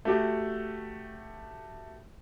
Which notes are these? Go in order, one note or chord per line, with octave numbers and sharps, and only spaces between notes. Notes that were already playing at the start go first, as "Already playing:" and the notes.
A3 F#4 G4